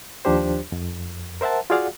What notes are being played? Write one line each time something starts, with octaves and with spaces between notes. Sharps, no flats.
D#2 F3 D4 G4 C5
F2
A#4 C5 E5 F#5 A5
F4 F#4 G#4 D5 F5 F#5